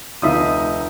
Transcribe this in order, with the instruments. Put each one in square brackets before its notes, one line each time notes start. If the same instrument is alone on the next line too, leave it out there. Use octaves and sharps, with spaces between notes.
[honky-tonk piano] F1 D#4 D#6 [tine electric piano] D2 F4 E5